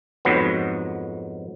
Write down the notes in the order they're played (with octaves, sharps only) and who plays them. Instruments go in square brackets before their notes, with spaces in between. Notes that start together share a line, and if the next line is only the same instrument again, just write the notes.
[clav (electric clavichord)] F2 G#2 F#3 B3